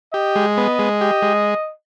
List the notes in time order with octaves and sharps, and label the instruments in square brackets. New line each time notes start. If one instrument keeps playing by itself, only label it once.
[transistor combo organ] G4 [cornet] D#5
[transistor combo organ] G#3
B3
G#3
G4
G#3